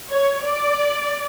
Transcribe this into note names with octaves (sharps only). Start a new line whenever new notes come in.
C#5
D5